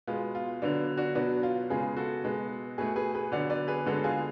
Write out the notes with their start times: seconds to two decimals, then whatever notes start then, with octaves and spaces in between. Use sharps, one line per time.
0.07 B2 G#3 B3 F4
0.35 F4
0.62 D3 F#3 B3 D4
0.97 D4 F#4
1.15 B2 F#3 B3 D4
1.43 F4
1.70 C#3 G#3 B3 F4 G#4
1.96 F#4 A4
2.24 B2 G#3 B3
2.78 B2 A3 G#4 B4
2.96 G#4 B4
3.15 G#4 B4
3.32 D3 F#3 B3 D5 F#5
3.50 B4 D5
3.68 G#4 B4
3.86 D3 G#3 B3 F#4 A4
4.04 F4 G#4